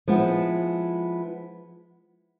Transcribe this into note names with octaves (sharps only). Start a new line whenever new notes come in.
F3 G#3 B3 E4